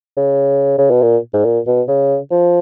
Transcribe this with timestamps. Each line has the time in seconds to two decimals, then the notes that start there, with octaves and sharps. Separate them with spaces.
0.17 C#3
0.78 C#3
0.91 B2
1.02 A#2
1.34 G#2
1.45 A#2
1.67 B2
1.88 C#3
2.31 F3